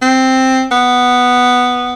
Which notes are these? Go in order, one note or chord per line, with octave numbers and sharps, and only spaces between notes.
C4
B3